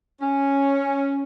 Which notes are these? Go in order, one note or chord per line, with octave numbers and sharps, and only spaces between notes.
C#4